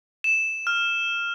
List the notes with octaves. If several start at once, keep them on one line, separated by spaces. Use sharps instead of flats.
E7
F6